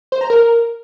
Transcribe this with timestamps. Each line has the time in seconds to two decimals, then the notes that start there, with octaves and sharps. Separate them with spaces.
0.12 C5
0.21 A#5
0.30 A#4